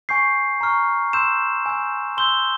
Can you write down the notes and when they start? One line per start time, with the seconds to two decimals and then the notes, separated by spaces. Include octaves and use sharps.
0.09 G#5 C#6 G6 C7
0.61 A#5 C#6 F6
1.13 C6 E6 G6 E7
1.66 G#5 E6 G6
2.17 C6 E6 G6 G7